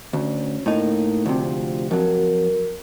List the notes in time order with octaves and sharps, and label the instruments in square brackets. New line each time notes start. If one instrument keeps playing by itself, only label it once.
[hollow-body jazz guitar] D2 [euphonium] C#4
[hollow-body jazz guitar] A2 D#4 [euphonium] A#3
[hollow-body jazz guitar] D2 C3 [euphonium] F3
[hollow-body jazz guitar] F2 F#3 [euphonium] A#4